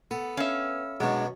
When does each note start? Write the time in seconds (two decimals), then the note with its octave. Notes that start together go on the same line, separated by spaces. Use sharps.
0.11 B3 A4
0.37 C#4 E5 F5
1.00 F#2 B2 F#3 G#3 D4